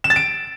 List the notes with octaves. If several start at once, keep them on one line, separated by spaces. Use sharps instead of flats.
E7
A6
D7